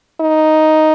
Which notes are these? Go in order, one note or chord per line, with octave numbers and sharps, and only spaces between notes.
D#4